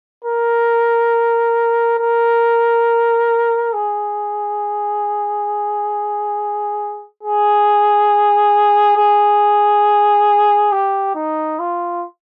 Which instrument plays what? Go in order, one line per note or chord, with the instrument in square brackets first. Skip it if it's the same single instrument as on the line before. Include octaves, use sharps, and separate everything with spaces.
[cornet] A#4
A#4
G#4
G#4
G#4
G4
D#4
F4